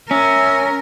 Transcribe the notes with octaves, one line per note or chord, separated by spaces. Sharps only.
C#4 A#4 E5